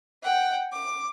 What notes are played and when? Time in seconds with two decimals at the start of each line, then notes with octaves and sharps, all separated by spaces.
0.22 F#5 G5
0.72 D6